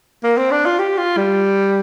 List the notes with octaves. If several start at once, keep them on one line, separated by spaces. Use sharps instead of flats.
A#3
C4
D4
F4
G4
F4
G3